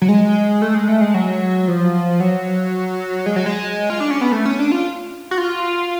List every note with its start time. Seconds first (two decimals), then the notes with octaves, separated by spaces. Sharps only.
0.02 F#3
0.09 G#3
0.62 A3
0.75 G#3
0.88 A3
1.01 G#3
1.14 F#3
1.68 F3
2.20 F#3
3.26 G#3
3.36 F#3
3.46 G#3
3.90 F4
4.00 D4
4.11 C#4
4.21 B3
4.32 A3
4.45 C#4
4.59 D4
4.72 F4
5.31 F#4
5.38 F4